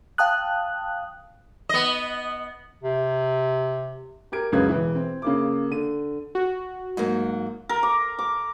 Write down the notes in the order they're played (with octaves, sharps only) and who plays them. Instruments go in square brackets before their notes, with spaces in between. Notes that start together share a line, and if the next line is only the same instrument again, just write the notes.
[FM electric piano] F5 G5 A5 D#6 F#6
[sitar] B3 D#5
[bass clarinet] C3
[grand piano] G4 A#4 G#6 D7
C#2 F#2 C#3 B4 G#6
E1 E3
C4
C#3 A#3 D6
D3 D#7
[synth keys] F#4
[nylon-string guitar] G#2 F#3 A#3
[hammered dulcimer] A#4
D6
D6